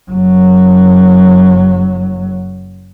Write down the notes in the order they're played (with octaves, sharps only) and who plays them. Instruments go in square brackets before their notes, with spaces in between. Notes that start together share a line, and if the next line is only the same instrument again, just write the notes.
[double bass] F#1 F#3